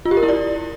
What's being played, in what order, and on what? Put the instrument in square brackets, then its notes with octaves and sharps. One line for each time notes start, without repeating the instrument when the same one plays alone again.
[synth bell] F4
G4
A#4
E4
D5